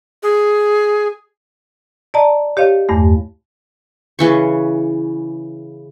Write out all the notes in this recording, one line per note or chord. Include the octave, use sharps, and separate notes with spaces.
G#4
D5 D#5 A5 A#5
G4 C#5 D#5 F5
E2 G2 A3
C#3 E3 C#6